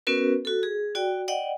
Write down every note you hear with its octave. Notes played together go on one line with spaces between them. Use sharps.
B3 C#4 F#4 A#4 B4
F#4 A4
G#4
F#4 D5 G5
D5 D#5 F#5 G5